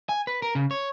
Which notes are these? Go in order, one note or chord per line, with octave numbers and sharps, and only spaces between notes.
G#5
B4
A#4
C#3
C#5